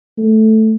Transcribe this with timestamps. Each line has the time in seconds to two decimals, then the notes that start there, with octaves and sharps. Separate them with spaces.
0.18 A3